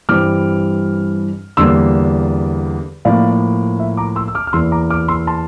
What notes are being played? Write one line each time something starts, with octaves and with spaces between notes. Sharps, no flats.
G2 E3 G3 C4 D6 F6
E2 D3 G3 A#3 C6 E6
A2 F3 A#3 D5 F5
E5
A#5 D6
C6 E6
E6
D6 F6
F6
E2 E3 A#3 C6 E6
A#5 D6
D6 F6
C6 E6
A5 C6